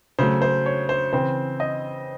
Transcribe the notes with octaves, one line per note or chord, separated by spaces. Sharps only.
C#3 F#3 A3 C5
C5
C#5
C5
C#3 E3 C4 C5
D#5